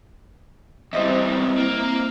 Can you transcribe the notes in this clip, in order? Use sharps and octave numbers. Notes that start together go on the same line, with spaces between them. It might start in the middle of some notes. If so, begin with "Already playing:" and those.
E2 G3 C4 E4 C5 D#5 E5 A#5
A#3